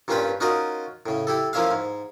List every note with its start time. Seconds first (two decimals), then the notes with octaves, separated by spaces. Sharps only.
0.08 G2 A#2 C#4 F4 B4 G5
0.40 C#4 D#4 F4 F#4 A#4 D#5
1.06 A2 C#3
1.27 E4 G4 A4
1.53 F3 A#3 C#4 E4 E5 F5
1.71 G#2